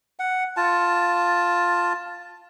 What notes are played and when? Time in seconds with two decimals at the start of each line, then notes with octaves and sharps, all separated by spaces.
0.19 F#5
0.57 F4 A5